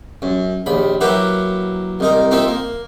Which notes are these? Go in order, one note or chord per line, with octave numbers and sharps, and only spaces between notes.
F#2
A#1 D#2 B5
F#3 A#3 E4 F#4 G4 B4
C2 D#4 A#4
A#3 C4 D#4 F4 E5
A#3